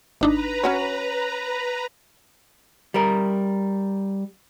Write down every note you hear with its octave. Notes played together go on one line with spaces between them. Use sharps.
G#1 D4 D#4 B4 A#5
C#4 F#4 C#5
G3 A#4